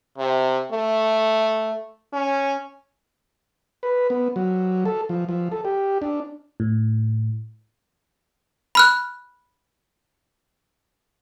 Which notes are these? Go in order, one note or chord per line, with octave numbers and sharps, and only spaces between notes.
C3
A3
C#4
B4
B3
F#3
A4
F3
F3
A4
G4
D4
A2
B5 F6 F#6